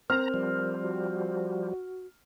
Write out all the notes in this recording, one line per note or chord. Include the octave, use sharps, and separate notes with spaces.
C4 A#4 A#5 F6
F3 G3
F#4